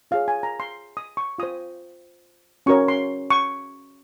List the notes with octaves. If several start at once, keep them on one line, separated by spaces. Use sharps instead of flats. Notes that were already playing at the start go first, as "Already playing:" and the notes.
F4 G#4 C#5 F5
G#5
A#5
C6
D#6
C#6
F4 C5 D#6
C#4 F#4 A#4 C#5 C#6
C6
C#6